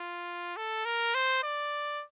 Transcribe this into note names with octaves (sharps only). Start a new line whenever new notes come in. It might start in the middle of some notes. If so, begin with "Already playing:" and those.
Already playing: F4
A4
A#4
C5
D5